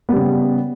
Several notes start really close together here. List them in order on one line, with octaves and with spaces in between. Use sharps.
B3 G3 C#3